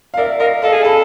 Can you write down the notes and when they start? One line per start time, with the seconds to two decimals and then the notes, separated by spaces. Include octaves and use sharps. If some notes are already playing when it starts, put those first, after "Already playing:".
0.14 F5
0.17 A#4 D5 E5
0.40 A#4 D#5 F5
0.62 A4 D#5 F5
0.73 G#4
0.82 A4 A5 B5